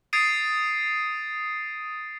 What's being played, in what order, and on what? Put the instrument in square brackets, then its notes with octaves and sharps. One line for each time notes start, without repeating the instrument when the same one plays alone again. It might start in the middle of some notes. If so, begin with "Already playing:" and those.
[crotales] D#6 G#6 A6 C7 D7 D#7